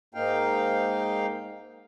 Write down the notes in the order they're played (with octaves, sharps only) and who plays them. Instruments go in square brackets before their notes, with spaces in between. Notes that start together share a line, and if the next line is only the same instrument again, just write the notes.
[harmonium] G#2 A#3 D#4 F5 G5